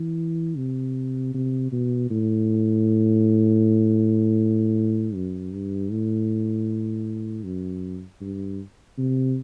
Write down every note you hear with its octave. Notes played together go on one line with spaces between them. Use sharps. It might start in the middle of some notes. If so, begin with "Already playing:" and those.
Already playing: E3
C3
C3
B2
A2
F#2
G2
A2
F#2
G2
C3